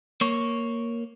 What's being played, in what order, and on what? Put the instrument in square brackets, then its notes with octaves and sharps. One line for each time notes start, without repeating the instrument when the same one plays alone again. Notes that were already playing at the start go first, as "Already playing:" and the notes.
[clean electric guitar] A#3 C#5